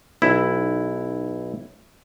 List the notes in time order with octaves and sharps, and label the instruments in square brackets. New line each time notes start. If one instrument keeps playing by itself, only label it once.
[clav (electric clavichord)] B1 E4